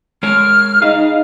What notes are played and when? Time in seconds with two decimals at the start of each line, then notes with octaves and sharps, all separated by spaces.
0.23 G#3 A#4 C#5 F6
0.82 D#4 G#4 F5